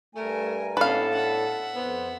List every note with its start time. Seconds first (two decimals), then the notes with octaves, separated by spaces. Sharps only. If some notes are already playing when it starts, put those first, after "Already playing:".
0.15 G2 G3 A3 A#4 G#5
0.77 A2 B3 C#4 D4 A4 B4 F5
1.12 E5 F#5
1.75 F2 B3 C5